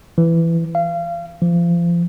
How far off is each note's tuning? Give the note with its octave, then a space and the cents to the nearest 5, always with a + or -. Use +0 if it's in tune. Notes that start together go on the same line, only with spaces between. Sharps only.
E3 +15
F5 -30
F3 -30